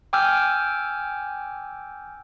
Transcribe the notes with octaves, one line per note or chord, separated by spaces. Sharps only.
G5 G#5 D6 E6 F6 G6